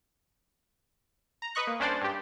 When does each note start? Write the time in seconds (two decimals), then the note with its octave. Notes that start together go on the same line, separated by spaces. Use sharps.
1.42 A#5
1.55 B4 D#5 C#6 F#6
1.67 A#3
1.80 C2 C#4 D4 C5 D5 A6
2.01 G2 G4